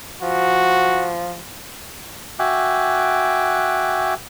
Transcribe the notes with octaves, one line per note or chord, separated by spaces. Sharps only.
F3 F#4
F#4 E5 G5 G#5 D6 F#6